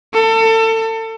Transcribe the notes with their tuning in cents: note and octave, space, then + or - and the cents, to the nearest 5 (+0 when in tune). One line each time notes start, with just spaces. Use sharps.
A4 +30